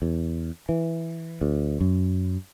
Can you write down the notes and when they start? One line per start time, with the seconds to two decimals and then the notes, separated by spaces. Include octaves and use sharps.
0.02 E2
0.69 E3
1.41 D2
1.81 F#2